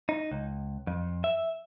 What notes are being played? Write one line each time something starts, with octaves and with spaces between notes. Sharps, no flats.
D#4
C#2
F2
E5